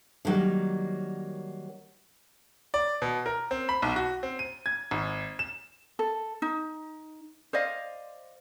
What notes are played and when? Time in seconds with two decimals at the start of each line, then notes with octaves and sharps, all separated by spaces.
0.25 D3 D#3 F#3 G3 A#3
2.74 D5
3.02 B2
3.26 A#4
3.51 C4
3.69 B5
3.82 B1
3.96 F#4
4.23 C4
4.39 D#7
4.66 G#6
4.91 G#1
5.39 E7
5.99 A4
6.42 D#4
7.53 C5 D5 D#5 F5